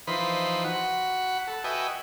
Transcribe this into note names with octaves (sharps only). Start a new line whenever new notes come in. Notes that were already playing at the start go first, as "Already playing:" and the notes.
E3 F3 D#4 B4 C5 B5
F#4 F#5 B5
A4
F#4 B4 D#5 E5 G5 G#5